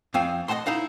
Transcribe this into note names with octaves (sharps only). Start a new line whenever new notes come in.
F2 C4 F5 G#5
D#5 F5 F#5 A5 C6
D#4 E4 F5 A5